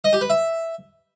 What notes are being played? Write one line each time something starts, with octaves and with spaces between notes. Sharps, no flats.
D#5
G4
B4
E5